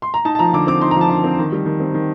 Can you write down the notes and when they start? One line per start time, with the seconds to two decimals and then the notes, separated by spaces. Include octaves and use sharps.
0.02 C6
0.14 A#5
0.25 D#4 A5
0.35 A5
0.39 F3 A#5
0.53 D3 D6
0.67 C4 D6
0.81 D#4 C6
0.91 A#5
0.96 F3 A5
1.09 D3 A5
1.24 C4
1.39 D#3
1.52 G3
1.66 D#3
1.80 C4
1.94 D#3